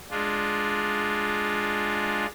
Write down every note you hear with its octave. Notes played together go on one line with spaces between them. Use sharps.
G#3 D4 F4